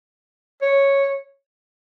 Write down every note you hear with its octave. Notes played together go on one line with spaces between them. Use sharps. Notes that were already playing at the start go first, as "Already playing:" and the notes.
C#5